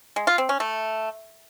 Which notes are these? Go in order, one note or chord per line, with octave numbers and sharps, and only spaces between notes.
G#3
F4
C4
C#4
A3